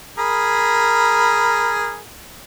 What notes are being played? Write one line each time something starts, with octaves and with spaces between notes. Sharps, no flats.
G#4 A#4 B5